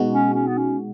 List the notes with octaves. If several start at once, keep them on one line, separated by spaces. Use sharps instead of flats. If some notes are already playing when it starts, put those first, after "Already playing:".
Already playing: B2 G#3 D#4 F#4
C#4
C#4
B3
C#4